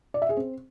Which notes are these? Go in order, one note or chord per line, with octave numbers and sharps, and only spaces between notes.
D5
E5
G#4
C4